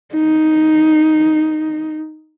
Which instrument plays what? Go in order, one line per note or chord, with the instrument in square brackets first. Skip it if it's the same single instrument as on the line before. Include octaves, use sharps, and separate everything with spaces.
[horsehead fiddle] D#4